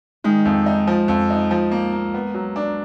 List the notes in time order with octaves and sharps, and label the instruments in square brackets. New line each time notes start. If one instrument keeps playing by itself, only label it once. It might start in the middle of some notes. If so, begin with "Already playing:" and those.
[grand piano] D#3 [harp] G#3
[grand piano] F2
D#4
F3
F2
D#4
F3
A#3
A#3
B3
F#3
D4